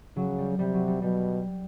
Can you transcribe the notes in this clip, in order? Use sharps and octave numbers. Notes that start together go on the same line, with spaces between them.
C#3 F#3
G3
C3 G3
F#3
G3
B2 G3